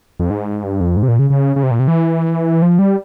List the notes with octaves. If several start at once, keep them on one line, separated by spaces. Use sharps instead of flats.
F2
G#2
G2
F2
G#2
C3
A#2
C#3
C#3
C#3
C3
A#2
C3
E3
F3
G3